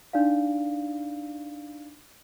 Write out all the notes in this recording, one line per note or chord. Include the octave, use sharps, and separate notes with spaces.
D4 D#4 D5 F5